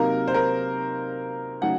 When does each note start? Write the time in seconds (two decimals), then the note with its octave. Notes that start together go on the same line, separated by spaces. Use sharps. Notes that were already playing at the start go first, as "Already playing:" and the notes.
Already playing: C3 F#3 A#3 D#4 A#4
0.28 C5
0.34 A#4
1.61 C#3 F#3 A3 D#4 F#5